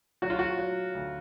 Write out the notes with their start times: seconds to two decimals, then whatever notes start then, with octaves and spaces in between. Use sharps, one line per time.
0.22 F#3 F#4
0.30 F4
0.39 F#4
0.59 F#3
0.95 D2